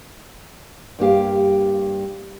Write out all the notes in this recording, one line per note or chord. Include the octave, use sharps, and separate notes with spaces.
G2 A#3 G4 F5